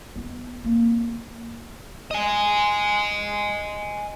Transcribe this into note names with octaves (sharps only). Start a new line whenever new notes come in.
B3 E4
A#3 C4
D#5 G#5